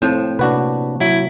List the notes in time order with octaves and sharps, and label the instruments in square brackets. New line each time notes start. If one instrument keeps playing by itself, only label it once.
[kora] A2 F3 [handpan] C4
[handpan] C3 A#3 [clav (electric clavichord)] D4 F#4 B4
[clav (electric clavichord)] F#3 [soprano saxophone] E4